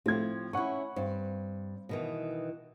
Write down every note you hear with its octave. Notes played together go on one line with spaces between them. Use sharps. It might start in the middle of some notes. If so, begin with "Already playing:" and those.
A2 F3 C4 G#6
C#4 E4 F#5 C#6
G2 C4
B2 D#3 E3